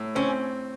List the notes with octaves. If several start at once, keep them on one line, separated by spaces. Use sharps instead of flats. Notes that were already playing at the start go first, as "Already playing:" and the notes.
Already playing: A2
C4 C#4